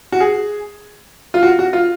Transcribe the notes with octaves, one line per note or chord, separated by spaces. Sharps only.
F#4
G#4
F4
F#4
F#4
F4